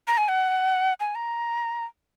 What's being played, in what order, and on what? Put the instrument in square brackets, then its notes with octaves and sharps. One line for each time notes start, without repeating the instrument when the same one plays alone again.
[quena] A#5
G#5
F#5
G#5
A#5